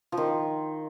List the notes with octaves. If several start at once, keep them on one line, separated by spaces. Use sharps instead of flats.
F3
D#3